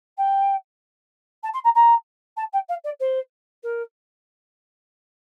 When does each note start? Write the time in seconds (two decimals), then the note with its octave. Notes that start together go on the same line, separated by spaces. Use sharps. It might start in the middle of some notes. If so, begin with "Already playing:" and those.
0.17 G5
1.43 A5
1.53 C6
1.64 A#5
1.75 A#5
2.37 A5
2.53 G5
2.69 F5
2.84 D5
3.00 C5
3.63 A#4